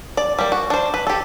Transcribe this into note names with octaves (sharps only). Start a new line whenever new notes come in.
D5
G3 A#3
F#4
D4 C5
B4
G4 A4